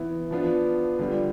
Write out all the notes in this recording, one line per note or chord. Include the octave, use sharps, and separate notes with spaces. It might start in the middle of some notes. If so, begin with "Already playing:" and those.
Already playing: E3 B3 E4
F3 B3 D4 F4
D3 G3 D4 F4